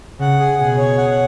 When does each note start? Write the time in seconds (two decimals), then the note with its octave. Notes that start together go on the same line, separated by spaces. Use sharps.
0.20 C#3 F#5
0.40 G#4
0.59 B2 G#4
0.78 C#5
0.98 F#5